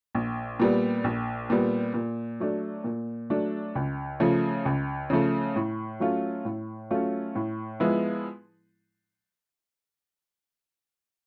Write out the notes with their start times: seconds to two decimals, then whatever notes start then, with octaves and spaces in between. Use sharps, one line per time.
0.15 A#1
0.60 A#2 G3 B3
1.04 A#1
1.50 A#2 G3 B3
1.94 A#2
2.40 F#3 A3 D4
2.84 A#2
3.30 F#3 A3 D4
3.75 C#2
4.20 C#3 F3 A3
4.65 C#2
5.10 C#3 F3 A3
5.56 A2
6.00 F#3 A3 C#4 F4
6.45 A2
6.91 F#3 A3 C#4 F4
7.35 A2
7.80 F3 G#3 B3 E4